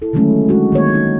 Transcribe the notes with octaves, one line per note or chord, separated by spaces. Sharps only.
E4 A4
D3 D#3 F#3 G#3 A3 C#4
G#3 D4 F#4
D#3 A#3 C#5
D#4